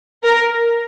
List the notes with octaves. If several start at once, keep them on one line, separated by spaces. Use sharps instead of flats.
A#4